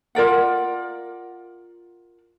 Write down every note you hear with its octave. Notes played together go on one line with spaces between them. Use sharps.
F4 A#4 D5 F#5